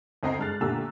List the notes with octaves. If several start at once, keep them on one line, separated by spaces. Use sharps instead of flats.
D2 C4 D#5 G5 A#5 C7
G2 G#3 F6 F#6 A6
A#2 D3 A3 G4 A#5 E6